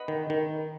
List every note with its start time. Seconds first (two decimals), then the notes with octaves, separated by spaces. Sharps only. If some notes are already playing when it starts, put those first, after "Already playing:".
Already playing: B4 D#5 F#5 B5
0.08 D#3
0.30 D#3